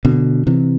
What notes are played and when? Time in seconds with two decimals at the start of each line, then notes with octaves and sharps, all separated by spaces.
0.05 B2 D3
0.47 C3 E3